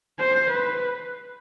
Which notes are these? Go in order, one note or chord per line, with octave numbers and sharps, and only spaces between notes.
C5
B4